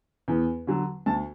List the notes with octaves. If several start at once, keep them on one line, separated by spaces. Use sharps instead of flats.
E2
D3 F#3
D2 A5